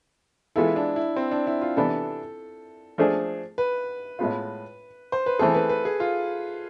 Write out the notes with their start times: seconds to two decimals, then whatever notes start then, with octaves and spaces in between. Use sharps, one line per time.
0.56 E3 G#3 B3 E4 F4 A4
0.76 D4
0.96 E4
1.16 C4
1.31 D4
1.47 E4
1.62 F4
1.77 C3 E3 B3 D4 A4
2.98 F3 A3 D4 G#4
3.58 B4
4.19 A2 G#3 B3 F4
5.12 C5
5.26 B4
5.39 E3 A3 C4 G#4 A4
5.55 B4
5.69 B4
5.85 G#4
6.00 F4